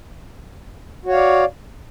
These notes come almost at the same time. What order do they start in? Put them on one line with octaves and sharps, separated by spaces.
F#4 C#5 F5 D5